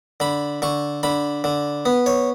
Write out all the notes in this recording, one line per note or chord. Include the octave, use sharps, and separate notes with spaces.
D3 B5
D3 C#6
D3 B5
D3
B3
C#5